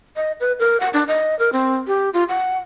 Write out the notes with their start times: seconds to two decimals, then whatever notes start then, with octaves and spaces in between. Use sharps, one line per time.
0.16 D#5
0.40 B4
0.59 A#4
0.80 F#5
0.93 D4
1.08 D#5
1.39 A#4
1.53 C4
1.87 G4
2.14 F4
2.29 F#5